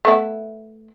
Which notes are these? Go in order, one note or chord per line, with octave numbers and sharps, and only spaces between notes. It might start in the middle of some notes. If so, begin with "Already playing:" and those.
A3 B3 E4